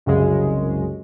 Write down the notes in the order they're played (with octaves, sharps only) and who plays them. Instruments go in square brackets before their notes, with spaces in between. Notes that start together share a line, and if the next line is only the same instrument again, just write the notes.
[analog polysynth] C2 F#2 C#3 G#3